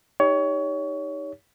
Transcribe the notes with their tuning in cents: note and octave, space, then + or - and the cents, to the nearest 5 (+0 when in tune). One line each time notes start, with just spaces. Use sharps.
D#4 +0 G4 +20 C#5 +25